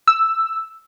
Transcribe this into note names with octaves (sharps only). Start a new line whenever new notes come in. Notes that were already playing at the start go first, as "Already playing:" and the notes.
E6